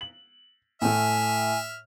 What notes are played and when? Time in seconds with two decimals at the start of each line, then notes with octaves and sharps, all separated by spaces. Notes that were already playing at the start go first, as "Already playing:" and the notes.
0.01 F#7
0.82 A2 A3 E5 G#5 F6